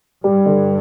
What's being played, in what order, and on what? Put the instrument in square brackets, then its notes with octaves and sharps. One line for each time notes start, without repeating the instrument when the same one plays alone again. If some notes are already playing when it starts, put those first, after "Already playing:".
[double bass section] G2 [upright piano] G3
[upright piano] D3